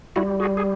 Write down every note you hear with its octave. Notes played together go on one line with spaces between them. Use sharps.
G3 E4 F#4
F#4 G#4
G#4